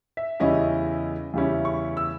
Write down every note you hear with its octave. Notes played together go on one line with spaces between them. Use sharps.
E5
E2 C#3 G3 C#4 E4 D#5
E2 C#3 G3 C#4 E4
C#6
E6